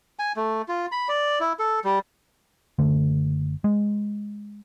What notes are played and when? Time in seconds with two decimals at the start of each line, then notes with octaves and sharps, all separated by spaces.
0.19 G#5
0.36 A3
0.68 F4
0.92 B5
1.09 D5
1.40 E4
1.59 A4
1.84 G3
2.79 F#1 D3 A3
3.64 G#3